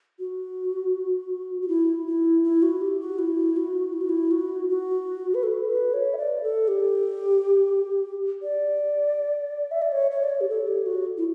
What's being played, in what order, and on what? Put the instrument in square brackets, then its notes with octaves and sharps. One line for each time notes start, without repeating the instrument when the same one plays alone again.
[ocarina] F#4
F#4
E4
E4
E4
F#4
G4
F#4
E4
F#4
E4
F#4
E4
F#4
F#4
B4
A4
B4
C#5
E5
D5
A4
G4
D5
E5
D5
C#5
C#5
D5
C#5
G4
A4
G4
F#4
E4